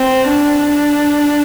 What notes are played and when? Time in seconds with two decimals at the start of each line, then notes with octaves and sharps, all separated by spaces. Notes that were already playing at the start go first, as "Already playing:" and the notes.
Already playing: C4
0.29 D4